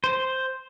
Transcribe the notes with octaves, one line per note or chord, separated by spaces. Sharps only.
C5